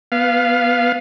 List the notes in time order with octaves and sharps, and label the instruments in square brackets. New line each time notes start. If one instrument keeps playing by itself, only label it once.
[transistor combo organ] B3 F5